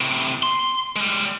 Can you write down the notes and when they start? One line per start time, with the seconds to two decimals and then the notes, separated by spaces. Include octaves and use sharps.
0.01 A2 C3
0.43 C6
0.96 G3 G#3